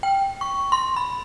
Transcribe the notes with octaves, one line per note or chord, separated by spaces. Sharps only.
G5
C#6
C6
B5